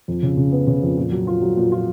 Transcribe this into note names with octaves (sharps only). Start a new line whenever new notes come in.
F2
C#3
C#3
B3
C#3
F2
A#2
F#3
F4
F#3
A#2
F4